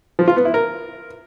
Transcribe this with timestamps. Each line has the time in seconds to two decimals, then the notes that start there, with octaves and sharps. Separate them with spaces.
0.19 F3
0.28 F4
0.36 B3
0.45 E4
0.54 A#4